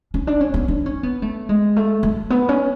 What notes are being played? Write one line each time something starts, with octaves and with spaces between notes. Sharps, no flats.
C#4
D4
C#4
B3
D4
C#4
B3
A3
G#3
A3
A3
B3
C#4